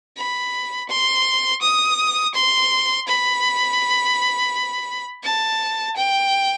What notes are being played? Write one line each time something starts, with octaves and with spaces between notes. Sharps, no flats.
B5
C6
D#6
C6
B5
A5
G5